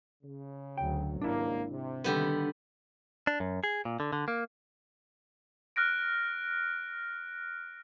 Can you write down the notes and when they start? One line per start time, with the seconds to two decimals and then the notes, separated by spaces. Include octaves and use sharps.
0.23 C#3
0.78 D2 F#3 G5
1.21 G#1 C#2 G2 A#3 D4 E4
1.69 C3
2.04 D3 D#3 G3 B3
3.27 D4
3.40 F#2
3.64 G#4
3.85 A#2
4.00 D3
4.13 D3
4.28 A#3
5.76 F6 F#6 A#6 D7